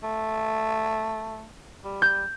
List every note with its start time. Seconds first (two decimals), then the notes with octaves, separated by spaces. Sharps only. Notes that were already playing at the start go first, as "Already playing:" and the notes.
0.03 A3
1.84 G3
2.02 G6